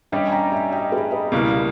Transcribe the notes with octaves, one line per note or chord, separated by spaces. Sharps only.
G2 G3 C#4 G4 D#5 G5
G#5
G5 A#5
E5 G#5
D#5 G5
G#4 B4
B4 D#5
C#2 B2 G3 A#3 E4